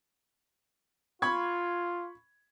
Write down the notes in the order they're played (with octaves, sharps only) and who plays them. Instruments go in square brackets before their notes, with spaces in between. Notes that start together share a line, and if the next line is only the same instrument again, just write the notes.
[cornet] F4 [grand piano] B5 C#6 G#6